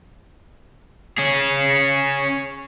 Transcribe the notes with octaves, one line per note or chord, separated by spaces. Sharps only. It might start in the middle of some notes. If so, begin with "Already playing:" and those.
C#4 G#4